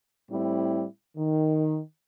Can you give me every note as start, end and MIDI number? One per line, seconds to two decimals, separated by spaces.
0.31 0.84 45
0.31 0.84 55
0.31 0.84 60
0.31 0.84 64
1.17 1.79 51